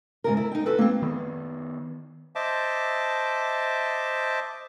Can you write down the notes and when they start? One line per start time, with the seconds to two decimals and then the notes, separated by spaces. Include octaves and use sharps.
0.24 G#2 C#3 A#4
0.37 E4
0.52 D#4 G5
0.66 F#4 A4 B4
0.79 A#3 C4
1.02 D#3 B3
2.36 C5 D#5 E5 A5 D6